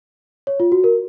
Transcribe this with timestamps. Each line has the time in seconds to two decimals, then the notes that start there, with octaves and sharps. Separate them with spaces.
0.47 C#5
0.60 F4
0.72 F#4
0.84 A#4